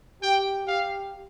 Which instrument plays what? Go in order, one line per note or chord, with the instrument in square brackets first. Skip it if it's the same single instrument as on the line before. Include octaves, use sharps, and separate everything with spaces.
[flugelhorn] G4 [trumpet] G5
[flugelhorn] G4 [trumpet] F5